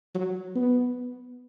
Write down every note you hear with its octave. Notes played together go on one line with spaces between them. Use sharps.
F#3
B3